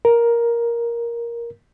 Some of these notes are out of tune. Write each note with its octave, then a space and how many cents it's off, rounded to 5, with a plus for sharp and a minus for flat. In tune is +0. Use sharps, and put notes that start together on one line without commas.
A#4 +10